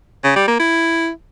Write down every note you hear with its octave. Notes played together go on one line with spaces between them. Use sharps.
C#3
G3
A#3
E4